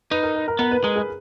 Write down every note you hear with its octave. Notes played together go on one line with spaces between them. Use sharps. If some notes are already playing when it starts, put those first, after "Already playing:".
D#4 B4
A#4
A#4
A#4
B3 A#4
B4
G#3 A#4
G#4